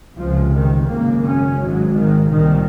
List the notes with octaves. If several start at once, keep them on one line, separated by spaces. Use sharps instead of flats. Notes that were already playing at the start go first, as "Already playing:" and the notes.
C#2 C3 F3
D#3
G#1 F#2 C#3 A#3
C#4
G#1 G#2 F#3
D#3
C2 A#2 D#3